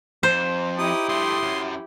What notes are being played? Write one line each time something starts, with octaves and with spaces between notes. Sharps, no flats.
F2 C5
D#4 E4 G4 D#6
G2 A3 C6 D#6
F#2